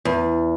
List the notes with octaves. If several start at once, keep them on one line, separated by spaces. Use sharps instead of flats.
E2